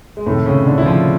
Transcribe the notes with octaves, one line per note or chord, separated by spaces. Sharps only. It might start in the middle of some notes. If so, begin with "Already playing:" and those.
G#3
A2 C3 D#3 A3
C#3 C#4
D3 D4
E4
F3 F4